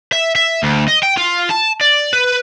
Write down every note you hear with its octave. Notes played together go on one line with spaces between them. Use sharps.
E5
E5
D2
D#5
G5
F4
A5
D5
B4